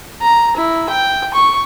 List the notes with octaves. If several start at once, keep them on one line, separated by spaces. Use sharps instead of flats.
A#5
E4
G5
C#6